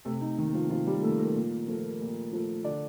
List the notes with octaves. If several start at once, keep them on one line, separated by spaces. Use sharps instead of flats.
C3 A3 A4
D#4
D#3 A#3 D#4
F3 F4
C3 F3 F4
G3 G4
D#3 A3 A#3 A4
A#3 A#4
A#2
F3 A3
A#2
F3 A3
D3 D4 D5